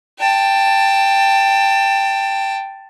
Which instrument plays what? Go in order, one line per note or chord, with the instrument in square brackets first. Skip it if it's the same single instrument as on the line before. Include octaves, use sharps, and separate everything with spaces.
[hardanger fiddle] G5 A5